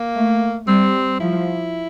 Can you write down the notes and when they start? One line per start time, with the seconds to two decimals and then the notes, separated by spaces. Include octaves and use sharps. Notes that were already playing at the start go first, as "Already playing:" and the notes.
Already playing: A#3
0.15 A3
0.68 G3 C4
1.20 F3 E4